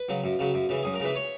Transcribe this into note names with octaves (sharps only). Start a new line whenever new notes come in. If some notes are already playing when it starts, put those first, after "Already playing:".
Already playing: B4
C#3 F#3
F#2
C#3 F#3
F#2
C#3 E3
F#2 G#4
A#4
C#3 E3 B4
C#5